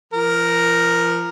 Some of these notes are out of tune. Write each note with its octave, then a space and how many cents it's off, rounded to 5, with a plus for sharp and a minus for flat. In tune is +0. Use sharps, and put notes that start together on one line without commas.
F3 -35 A#4 +0